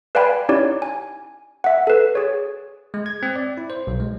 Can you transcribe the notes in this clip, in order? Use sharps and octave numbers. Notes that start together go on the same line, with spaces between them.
B4 D5 F5 G5 G#5 B5
C#4 D#4 E4 G4 C#5 D5
G#5
E5 F#5
A4 B4
G#4 C#5
G#3
G#6
C4
D5
E4
C5
B1
G#3